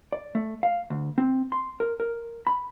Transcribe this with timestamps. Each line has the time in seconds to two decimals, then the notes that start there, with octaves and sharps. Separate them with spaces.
0.12 D5
0.35 A3
0.63 F5
0.90 D2
1.18 C4
1.52 C6
1.80 A#4
2.00 A#4
2.47 B5